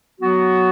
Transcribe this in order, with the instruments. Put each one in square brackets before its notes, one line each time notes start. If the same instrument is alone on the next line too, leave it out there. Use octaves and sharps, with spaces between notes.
[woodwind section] F#3 B3 F#4